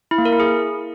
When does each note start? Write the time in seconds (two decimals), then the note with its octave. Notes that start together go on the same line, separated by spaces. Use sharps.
0.11 E4
0.18 A#3
0.25 A#4
0.33 E4
0.40 G#4